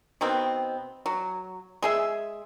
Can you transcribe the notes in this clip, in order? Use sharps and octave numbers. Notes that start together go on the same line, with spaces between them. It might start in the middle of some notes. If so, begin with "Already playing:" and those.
B2 D#3 B3 C4
F#3
G#3 G#4 E5